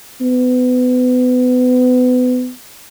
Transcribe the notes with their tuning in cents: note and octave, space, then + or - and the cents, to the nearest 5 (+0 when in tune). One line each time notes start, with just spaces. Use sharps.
B3 +30